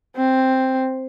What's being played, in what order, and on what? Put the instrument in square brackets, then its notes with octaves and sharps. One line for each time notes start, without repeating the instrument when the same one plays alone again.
[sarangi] C4